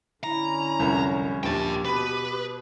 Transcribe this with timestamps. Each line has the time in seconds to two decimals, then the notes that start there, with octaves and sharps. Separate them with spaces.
0.24 D3 C#4 E4 A#5
0.79 F1 C2 F#2
1.43 A#1 D#2 G4 G5 A5
1.85 B2 B3 B4 B5